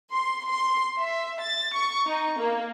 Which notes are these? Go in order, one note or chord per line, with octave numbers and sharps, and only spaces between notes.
C6
C6
E5
A6
C#6
D#4
A#3